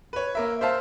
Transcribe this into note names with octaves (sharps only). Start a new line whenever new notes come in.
B4 C#5
A#3 A#4 E5
C5 E5 F5 A5